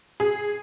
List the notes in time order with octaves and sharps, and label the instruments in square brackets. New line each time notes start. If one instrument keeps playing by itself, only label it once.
[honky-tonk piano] G#4